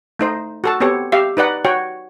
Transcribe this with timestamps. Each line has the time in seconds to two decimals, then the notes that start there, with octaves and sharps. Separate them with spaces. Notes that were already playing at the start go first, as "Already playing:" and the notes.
0.19 A3 D#4 C5
0.64 F#4 A4 A5
0.80 B3 C4 G4 A4 C#5
1.12 G4 E5 F5
1.37 D#4 B4 D5 F#5
1.65 F#4 C#5 G5